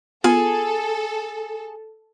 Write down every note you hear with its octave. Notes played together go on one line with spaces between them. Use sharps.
B3 F4 G#4 A4